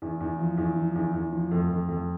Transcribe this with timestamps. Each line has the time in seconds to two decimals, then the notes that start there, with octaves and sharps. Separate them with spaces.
0.02 E2
0.21 E2
0.39 F3
0.58 E2
0.76 F3
0.95 E2
1.14 E2
1.33 F3
1.51 F2
1.70 F2
1.89 F2